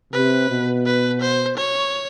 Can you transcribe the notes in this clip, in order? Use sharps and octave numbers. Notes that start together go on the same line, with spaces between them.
C3 B4
B2
B4
C5
C#5